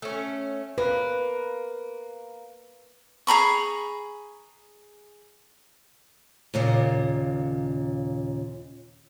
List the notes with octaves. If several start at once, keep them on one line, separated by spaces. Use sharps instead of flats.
A3 C#4
A#3 B4
G#4 A#5 B5 C#6
D#2 A#2 C#3